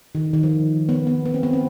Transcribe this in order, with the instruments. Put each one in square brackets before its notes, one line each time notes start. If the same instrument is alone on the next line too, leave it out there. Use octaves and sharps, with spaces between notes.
[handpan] D#3
D#3
F3
B3
B3
B3
C4
B3
C4